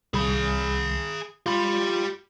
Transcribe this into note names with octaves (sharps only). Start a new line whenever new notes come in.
C2 G#4 B5
F4 G4 B5